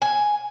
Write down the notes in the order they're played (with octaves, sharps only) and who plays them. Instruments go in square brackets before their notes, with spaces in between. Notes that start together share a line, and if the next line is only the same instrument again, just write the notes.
[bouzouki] G#5